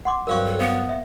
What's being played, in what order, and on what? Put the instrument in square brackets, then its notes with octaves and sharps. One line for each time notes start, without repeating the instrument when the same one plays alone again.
[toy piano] F#5 C6 D6
[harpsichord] G2 F#3 C4 [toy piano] A#4 F5 C#6
[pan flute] A4
[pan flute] B3 [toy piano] C5 F5
[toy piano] E5